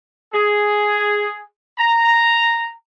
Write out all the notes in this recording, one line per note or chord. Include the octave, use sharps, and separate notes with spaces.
G#4
A#5